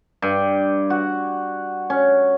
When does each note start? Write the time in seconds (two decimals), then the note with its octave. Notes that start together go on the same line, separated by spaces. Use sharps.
0.22 G2
0.90 F#4
1.90 C#4